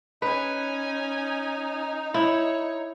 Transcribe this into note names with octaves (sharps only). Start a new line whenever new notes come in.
C#4 D#4 B4 G#5
E4 C#5